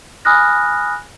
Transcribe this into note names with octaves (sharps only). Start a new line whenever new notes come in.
G#5 B5 D#6 F6 F#6 A#6